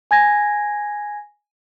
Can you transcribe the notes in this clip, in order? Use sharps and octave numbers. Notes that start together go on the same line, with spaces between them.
G#5 G#6 A#6